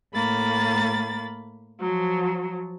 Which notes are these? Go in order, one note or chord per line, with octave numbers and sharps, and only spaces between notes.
A2 A#3 B5 A6
F3 F#3